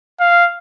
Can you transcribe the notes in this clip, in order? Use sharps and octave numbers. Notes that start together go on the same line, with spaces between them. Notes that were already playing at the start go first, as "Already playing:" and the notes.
F5